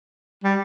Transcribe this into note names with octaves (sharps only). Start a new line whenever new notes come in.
G3